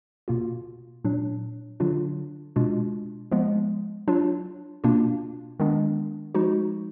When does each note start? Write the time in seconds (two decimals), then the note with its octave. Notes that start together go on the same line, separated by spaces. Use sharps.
0.28 B2 A#3 F4
1.04 A#2 F#3 D4
1.80 D3 F#3 D4 F4
2.56 B2 G#3 D4 F4
3.31 F3 G#3 B3
4.08 F#3 D4 F4
4.84 B2 A#3 D4 F4
5.60 D#3 G#3 B3 D4
6.35 F3 G#3 D#4 F#4